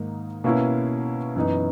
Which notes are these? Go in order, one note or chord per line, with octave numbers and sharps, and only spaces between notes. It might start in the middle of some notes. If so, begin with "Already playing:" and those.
Already playing: G#2 D#3 A#3 D#4
B2 A#3 C#4 E4
F#2 E3 B3 D#4